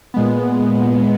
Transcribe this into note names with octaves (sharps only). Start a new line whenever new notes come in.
A#2 G#3 B3